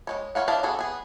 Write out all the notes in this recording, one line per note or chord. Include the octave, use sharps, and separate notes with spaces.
G#3 A3 C#5
F4 F#4 C#5 F5 F#5
D4 E4 D#5 F5 A5
B3 F#4 G#4 A4
B3 G#4